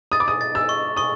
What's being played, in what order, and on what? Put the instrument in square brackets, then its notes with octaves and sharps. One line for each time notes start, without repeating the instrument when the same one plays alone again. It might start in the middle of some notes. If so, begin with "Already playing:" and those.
[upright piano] D#6 [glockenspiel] A6
[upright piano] D6
D#6
[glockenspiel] A6
[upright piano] E6
[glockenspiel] C#6
[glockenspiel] C#6 [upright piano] D#6